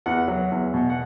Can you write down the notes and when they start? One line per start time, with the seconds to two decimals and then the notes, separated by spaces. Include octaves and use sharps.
0.06 E2 F#5
0.28 F#3
0.52 E2
0.74 B2
0.90 F#5